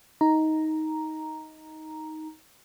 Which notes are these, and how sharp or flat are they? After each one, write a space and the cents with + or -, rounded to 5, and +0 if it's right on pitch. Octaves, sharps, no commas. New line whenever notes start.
D#4 +15 A#5 +0